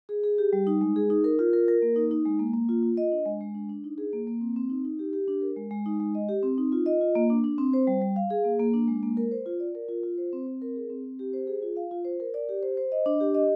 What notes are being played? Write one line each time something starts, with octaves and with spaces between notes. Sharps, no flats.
G#4
G#4
G4
G3
D#4
G#3
G#4
D#4
A#4
F4
A#4
A#4
A#3
D#4
D#4
G#3
A#3
A#3
F4
F4
D#5
D4
G#3
G#3
D4
D4
D#4
G#4
A#3
A#3
C4
C4
D#4
D#4
G4
G4
D4
A#4
G#3
G#3
D#4
G#3
D#5
G4
C4
D#4
F4
D#5
F4
A#3
D4
D4
C4
C5
G3
G3
F5
G#4
A#3
A#3
D4
G#3
A#3
A#4
C5
F4
D5
A#4
F4
F4
C5
C4
C4
A#4
G#4
C4
C4
G4
C5
G#4
F4
F5
F4
C5
A#4
D5
G4
C5
C5
D#5
D4
G4
D#5